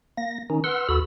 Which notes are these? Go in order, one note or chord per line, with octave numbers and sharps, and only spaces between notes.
A#3 A#6
D#3 C#4 D#4
B4 F#5 C6 E6 F6
D#2 F#4 A4 B5 E6